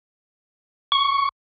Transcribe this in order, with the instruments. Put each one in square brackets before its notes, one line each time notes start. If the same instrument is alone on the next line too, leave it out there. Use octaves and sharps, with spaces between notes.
[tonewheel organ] C#6